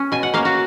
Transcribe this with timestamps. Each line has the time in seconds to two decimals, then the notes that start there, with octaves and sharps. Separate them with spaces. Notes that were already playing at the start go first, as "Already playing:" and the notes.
Already playing: C#4
0.12 B2 G#5
0.23 F#5
0.34 A#3 C#4 F5
0.45 F#4